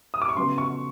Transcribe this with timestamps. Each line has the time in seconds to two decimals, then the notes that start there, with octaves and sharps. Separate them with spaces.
0.14 D#6
0.22 D6
0.29 C#6
0.37 C#3 F#3 B3 C6
0.58 C#6